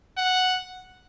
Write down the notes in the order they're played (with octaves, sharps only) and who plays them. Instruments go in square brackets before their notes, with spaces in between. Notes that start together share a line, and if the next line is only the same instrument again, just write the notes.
[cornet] F#5